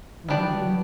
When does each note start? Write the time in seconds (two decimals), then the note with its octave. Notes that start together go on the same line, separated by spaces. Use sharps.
0.24 E3
0.29 D3 B3 D4 G4 D5
0.38 F#3
0.45 E3
0.54 G3
0.61 F#3